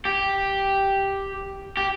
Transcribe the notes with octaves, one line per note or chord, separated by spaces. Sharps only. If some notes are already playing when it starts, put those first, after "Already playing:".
G4
G4